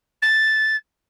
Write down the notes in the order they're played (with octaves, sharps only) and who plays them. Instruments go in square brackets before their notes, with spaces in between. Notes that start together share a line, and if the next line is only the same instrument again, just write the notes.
[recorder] A6